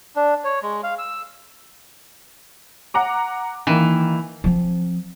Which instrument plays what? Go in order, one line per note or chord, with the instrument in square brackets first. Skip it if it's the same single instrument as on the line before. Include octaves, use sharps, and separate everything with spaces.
[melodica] D4
C#5
G#3
F5
E6
[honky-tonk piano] F#5 A#5 D6
[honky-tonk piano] D#3 A#3 [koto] E3
[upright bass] F3 C4